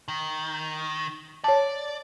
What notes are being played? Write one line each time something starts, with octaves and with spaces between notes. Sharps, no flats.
D#3
C#5 D5 A5